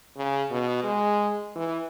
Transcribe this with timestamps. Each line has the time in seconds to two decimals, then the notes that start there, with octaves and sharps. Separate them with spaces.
0.17 C#3
0.51 B2
0.83 G#3
1.56 E3